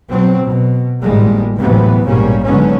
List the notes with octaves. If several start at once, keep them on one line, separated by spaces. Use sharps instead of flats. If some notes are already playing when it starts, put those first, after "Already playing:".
B2 F#3 C4
B2
G#1 A2 G3 G#3 A#3
D#2 A2 C3 E3 F#3 B3
A#1 G#2 B2 G3 A#3 C#4
G#2 D3 F#3 B3 C#4